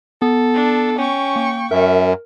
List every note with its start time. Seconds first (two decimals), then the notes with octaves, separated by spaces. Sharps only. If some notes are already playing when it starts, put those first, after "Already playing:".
0.22 B3 A4
0.54 D4
0.98 C#4 G5 C#6
1.36 A#3
1.71 F#2 A#4 E5